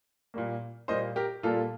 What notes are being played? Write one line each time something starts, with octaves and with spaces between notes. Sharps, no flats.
A#2 G3 A#3
A#2 G3 A#3 C5 D#5
G4 A#4
A#2 G3 A#3 F4 A4